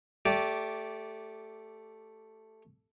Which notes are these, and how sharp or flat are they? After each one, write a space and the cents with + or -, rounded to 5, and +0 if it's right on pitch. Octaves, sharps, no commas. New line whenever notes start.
A3 +0 G4 -10 D5 -15